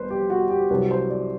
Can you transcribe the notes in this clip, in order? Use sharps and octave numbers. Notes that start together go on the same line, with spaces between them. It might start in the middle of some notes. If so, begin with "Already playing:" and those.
Already playing: G1 B4 C5
G4
F#4
G4
C2 C3 F#3 B4
C5
D5